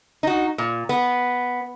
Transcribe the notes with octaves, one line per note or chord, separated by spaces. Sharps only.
D#4 F#4
A#2
B3